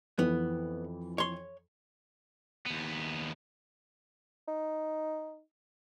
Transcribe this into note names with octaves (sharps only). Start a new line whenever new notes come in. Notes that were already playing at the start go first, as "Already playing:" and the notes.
F2 E3 B3
C#5 C6
D#2 B3
D#4